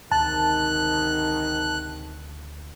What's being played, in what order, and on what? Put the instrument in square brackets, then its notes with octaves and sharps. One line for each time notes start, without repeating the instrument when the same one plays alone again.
[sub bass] D2 [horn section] G#2 C3 D#3 [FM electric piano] A5 [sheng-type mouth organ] F#6